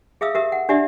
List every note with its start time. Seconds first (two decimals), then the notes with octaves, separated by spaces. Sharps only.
0.21 G#4 E5 F5 D#6 E6
0.35 G4 A#4 E5
0.52 F#5
0.69 D4 G4 D5 E5